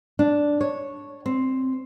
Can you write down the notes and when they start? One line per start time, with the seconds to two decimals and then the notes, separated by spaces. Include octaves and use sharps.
0.19 D4
0.61 C#5
1.26 C4